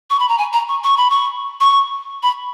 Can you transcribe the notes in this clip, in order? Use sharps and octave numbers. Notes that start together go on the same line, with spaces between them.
C#6
B5
A#5
G#5
A#5
C#6
C#6
B5
C#6
C#6
B5